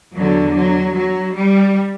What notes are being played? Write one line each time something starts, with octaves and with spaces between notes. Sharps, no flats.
E2 D3 F#3
F#3
F#3
G3